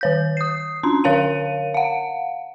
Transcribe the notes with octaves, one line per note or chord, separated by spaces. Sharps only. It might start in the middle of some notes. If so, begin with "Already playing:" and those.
D#3 C#5 G6
D#6 C7
C#4 D4 C6
D3 A#4 C#5 F5 A5 D#7
F5 F#5